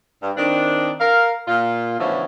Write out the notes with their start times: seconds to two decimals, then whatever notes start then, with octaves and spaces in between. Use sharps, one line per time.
0.23 G2
0.37 D#3 C4 D4
1.00 A#4 F5
1.48 A#2 F4
2.00 B2 D3 E3 F3 A3 C#4